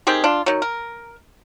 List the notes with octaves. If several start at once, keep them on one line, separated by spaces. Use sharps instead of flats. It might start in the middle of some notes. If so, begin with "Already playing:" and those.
D#3 C4 G4 G#4
D4 F4
D#3 F#3
A#4